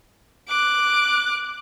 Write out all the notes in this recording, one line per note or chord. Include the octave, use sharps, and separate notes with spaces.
D6 F#6